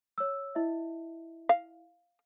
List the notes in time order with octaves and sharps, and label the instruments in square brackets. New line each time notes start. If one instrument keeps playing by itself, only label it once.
[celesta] C#5 E6
E4 D#5 E5
[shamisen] F5